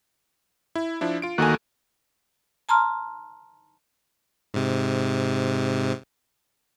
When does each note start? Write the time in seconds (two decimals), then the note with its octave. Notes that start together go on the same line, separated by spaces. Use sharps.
0.75 E4
1.01 F3 D4 E4
1.22 F4 D7
1.38 D2 D#3 A#3 F#4 A4 G#5
2.69 A5 A#5 C6 F6
4.54 G#2 C3